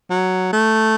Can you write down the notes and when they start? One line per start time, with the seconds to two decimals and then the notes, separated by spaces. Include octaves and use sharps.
0.10 F#3
0.52 A3